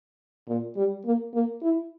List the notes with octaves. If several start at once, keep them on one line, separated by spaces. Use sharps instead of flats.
A#2
G3
A#3
A#3
E4